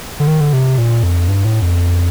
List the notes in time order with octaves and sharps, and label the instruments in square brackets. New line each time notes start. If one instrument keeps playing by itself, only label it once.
[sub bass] D3
D#3
D3
C3
A#2
F2
G2
A2
F2